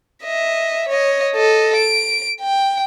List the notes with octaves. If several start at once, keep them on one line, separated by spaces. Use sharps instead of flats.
D#5 E5
C#5 D#5
A4 D#5
D7
G5